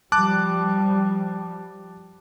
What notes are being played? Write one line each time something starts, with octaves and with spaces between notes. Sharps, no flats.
F3 G3 A5 D6 F#6